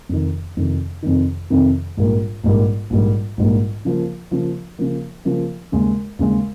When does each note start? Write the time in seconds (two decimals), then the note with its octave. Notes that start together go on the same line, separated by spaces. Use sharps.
0.09 F2 C3 D#3
0.57 F2 C3 D#3
1.03 F2 C3 D#3
1.50 F2 C3 D#3
1.97 A#1 G#2 G3 A#3
2.44 A#1 G#2 G3 A#3
2.90 A#1 G#2 G3 A#3
3.37 A#1 G#2 G3 A#3
3.85 C#3 F3 A#3
4.31 C#3 F3 A#3
4.78 C#3 F3 A#3
5.25 C#3 F3 A#3
5.72 D#2 C#3 G#3
6.19 D#2 C#3 G#3